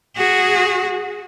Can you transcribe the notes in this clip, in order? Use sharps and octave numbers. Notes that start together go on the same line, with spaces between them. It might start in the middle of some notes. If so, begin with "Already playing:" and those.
F#4 G#4